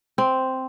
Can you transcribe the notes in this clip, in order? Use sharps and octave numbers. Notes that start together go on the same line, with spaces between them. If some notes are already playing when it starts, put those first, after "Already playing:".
C4